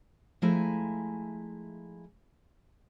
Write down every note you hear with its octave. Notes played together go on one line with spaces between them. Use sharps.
F3 G#3 A3 E4 G#5 A#5